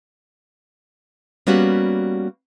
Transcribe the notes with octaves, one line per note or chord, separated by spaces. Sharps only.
G3 A#3 B3 C#4 F#4 G4